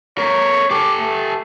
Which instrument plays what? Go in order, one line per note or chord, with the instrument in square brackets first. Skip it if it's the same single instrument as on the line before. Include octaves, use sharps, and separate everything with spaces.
[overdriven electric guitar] A3 A#4 [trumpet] C#5
[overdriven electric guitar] G4 A4 [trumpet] D6
[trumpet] A3